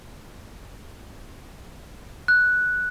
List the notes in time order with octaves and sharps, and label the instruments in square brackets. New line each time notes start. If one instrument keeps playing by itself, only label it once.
[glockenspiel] F#6